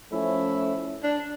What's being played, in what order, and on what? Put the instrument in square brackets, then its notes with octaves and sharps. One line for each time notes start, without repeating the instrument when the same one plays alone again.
[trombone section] F3 A3 C#4 [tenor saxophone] E4
[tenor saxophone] D4